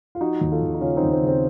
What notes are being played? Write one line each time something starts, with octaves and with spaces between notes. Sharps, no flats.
F4
F3 D#4 F#4
D#2
F4 A4
D#2
D#4
C#3 C#4 F4
C4 D#4
D#2
C4
C#3 C4